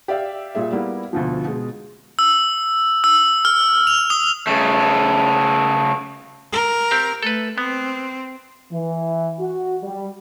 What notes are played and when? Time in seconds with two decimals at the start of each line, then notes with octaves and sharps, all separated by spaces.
0.08 G4 D5 E5 F5
0.55 A#2 G3 G#4 E5
0.73 G3 A#3 B3 E4
1.13 D2 B2 F3
1.45 B2 G#3
2.19 E6
3.04 E6
3.45 F6
3.87 F7
4.10 D#6
4.47 C#3 A3
6.53 A#4
6.91 C4 G4 F5
7.23 A3 A4 B4
7.58 B3 C4
8.72 E3
9.39 F#4
9.83 G3